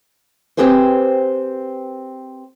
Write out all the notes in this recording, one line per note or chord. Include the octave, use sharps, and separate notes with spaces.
C4 G4 G#4 B4 C5